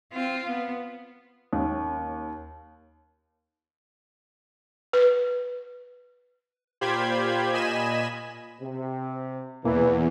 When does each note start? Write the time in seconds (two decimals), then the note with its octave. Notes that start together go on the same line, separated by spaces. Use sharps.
0.13 C4 F4
0.49 B3
1.53 D#2 C#4
4.93 B4
6.81 A#2 F4 G4 C5 B5 G#6
7.52 A#2 D#5 G#5 B5 E7
8.61 C3
9.65 E2 B2 E3 A#3